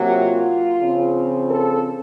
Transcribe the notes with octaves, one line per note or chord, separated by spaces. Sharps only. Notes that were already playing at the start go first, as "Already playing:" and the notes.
Already playing: C3 F#3 A#3
F4
C#3 F3 C4
A4